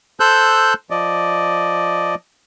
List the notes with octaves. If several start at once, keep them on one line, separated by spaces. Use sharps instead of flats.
A4 C5 E6 F#6 G6
F3 D5 D#5